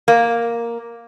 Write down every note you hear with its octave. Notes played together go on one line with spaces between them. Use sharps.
A#3